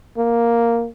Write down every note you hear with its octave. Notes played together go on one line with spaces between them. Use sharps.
A#3